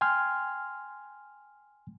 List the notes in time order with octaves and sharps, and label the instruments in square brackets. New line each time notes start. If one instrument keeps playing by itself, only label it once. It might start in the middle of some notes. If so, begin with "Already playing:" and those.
[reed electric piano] G5 G#5 C6 F6